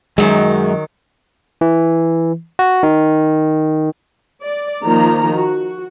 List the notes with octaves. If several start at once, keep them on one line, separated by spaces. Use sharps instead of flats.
F#2 D#3 F#3 G#3
E3
F#4
D#3
D5
D#3 F3 A#3 A#5
F#4